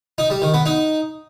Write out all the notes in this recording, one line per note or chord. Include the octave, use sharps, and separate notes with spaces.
D#4
G3
D#3
B3
D#4